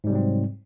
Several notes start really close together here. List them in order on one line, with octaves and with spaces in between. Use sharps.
G#2 G3 C3 F#3 C4